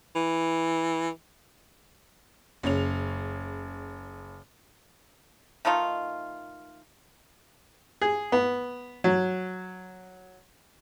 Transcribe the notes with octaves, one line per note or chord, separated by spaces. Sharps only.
E3
F#1 C#3 C#5 F7
D#3 A3 D#4 F4
G#4
B3
F#3